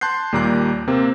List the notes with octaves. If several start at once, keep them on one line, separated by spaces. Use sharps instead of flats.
A5 C6 F#6 G6 C7
D#2 A#2 G3 A#5 D6 F#6
C3 A#3 C4